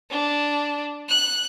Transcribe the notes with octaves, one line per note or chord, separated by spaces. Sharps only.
D4
F#6